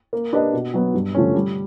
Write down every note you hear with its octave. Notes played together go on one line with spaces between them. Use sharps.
A#3
D4 G4 B4 D#5
B2
F#3 B3
G2
D3 F3 A3 C#4
G3